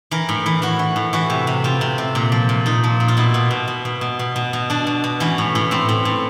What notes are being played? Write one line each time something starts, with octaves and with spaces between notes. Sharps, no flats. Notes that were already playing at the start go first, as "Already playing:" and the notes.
E3 A#4
A2
E3
E3 F#4
E3
A2
E3 F#4
C3
C3
C3 F4
C3
C3
A#2
F3
A#2
A#2 D#4
F3
A#2
F4
B2 E4
B2
B2
B2
B2
B2
B2
B2
B2
B2 D4
B2
B2
E3 C#4
A2
A2
A2 C4
A2
A2